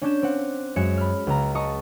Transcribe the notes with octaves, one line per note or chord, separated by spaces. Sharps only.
C#4 D4 G6 E7
C4 F#5
F#2 G#3 G#6 C#7 E7
B5 F6
C#2 A#5
D#5 A5 A#5 C#6 D#6